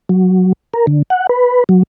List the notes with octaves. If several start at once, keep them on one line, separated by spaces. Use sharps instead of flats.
F#3
A#4
D3
F#5
B4
F#3